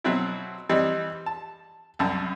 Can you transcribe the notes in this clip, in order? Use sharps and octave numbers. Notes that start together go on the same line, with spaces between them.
B2 F#3 C4 E4
E3 G3 C4 D#4
A5
C2 F#2 A5